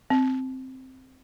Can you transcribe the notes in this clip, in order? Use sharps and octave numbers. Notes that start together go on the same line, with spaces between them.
C4